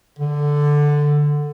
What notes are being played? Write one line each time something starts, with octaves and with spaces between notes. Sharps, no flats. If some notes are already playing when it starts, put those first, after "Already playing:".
D3